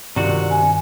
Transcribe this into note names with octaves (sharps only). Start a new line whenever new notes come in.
G2 C3 D#3 F4 F#4 D5
G#5